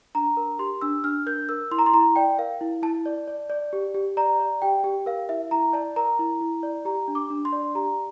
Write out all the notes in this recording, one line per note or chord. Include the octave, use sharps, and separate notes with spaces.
D4 A#5
A#4
G4 C6
D4 E6
D4 F6
A#4 G6
A#4 E6
E4 C6
A#5
C6
E4 A#5
D5 G5
A#4 F5
E4
E4 A5
D5
D5
D5
G4
G4
D5 A#5
D5
G4 G5
G4
A#4 F5
E4 E5
E4 A#5
D5 A5
A#4 A#5
E4
E4
D5
G4 A#5
D4
D6
D4
C6
D5
G4 A#5